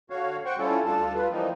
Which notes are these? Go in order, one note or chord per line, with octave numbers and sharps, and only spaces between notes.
D3 F#4 C#5 F5
F#4 C5 F#5 G5 C#6
G3 C#4 E4 F4 A4
D2 G3 D4 F4 A4 A5
G3 F4 B4
E3 F3 G3 A#3 C4 D#4